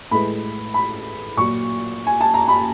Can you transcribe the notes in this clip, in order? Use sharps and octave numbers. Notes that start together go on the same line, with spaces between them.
A2 E3 G#3 B5
B5
A#2 F#3 C#6
G#5
A5
A#5
B5